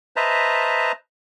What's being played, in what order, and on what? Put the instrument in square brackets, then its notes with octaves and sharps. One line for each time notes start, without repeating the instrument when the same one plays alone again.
[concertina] B4 C5 D#5 E5 A5 A#5